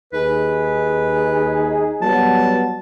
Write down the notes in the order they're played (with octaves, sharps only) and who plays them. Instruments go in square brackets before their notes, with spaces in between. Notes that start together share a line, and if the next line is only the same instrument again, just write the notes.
[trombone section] D#2 D#4 G#4 [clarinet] B4
[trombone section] F#3 G3 B3 [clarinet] A5